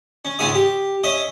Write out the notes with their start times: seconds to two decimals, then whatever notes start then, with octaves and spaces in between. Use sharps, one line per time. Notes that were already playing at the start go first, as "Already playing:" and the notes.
0.25 C#4
0.39 C#2 G#2 C#4 G#4 E5 D#6
0.54 G4
1.04 C#4 D#5 E5 D#6